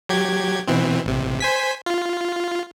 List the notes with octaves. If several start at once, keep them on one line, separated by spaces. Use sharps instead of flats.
F#3 G4 G#6
B2 E3 C4
A1 C3
C5 G#5 B6
F4